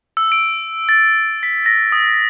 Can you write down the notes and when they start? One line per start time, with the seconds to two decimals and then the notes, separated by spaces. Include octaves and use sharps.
0.17 E6
0.32 D7
0.89 A6
1.43 B6
1.66 A#6
1.92 D#6